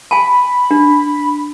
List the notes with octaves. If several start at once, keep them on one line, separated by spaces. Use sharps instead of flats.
G#5 A5 B5
D4